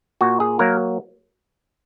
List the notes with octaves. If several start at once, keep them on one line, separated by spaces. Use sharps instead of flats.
A#2 F#4
G#4
F#3 A#3 A#4